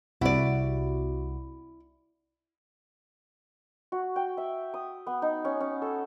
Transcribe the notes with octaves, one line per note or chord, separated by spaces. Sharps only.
C2 C3 E4 F#4 D5
F#4
G5
E5
D#6
B3
D#4
C#4
C#4
A4